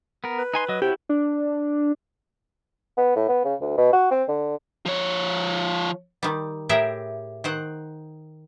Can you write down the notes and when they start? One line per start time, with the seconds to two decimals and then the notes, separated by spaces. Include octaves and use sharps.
0.24 B3 A#4
0.39 B4
0.54 D#4 G#5 C6
0.69 F#3 D#5
0.82 C3 E4 F#4 G4 C#5
1.09 D4
2.98 B3
3.16 A2
3.29 B3
3.45 C#3
3.61 D2
3.78 B2
3.93 F#4
4.11 C4
4.28 D3
4.86 F3 C#5
6.23 D#3 G3
6.69 A2 G4 G#4 A#4 E5
7.44 D#3 C5 F#5